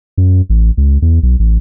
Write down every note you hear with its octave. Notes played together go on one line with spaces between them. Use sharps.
F#2
A1
C#2
E2
B1
A1